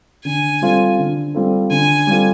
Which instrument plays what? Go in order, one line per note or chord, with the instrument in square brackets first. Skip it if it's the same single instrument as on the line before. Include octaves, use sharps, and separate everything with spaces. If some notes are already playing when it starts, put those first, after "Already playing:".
[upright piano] D3 [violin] G#5
[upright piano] G3 C4 F4 A4
D3
G3 C4 F4 A4
[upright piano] D3 [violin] G#5
[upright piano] G3 C4 F4 A4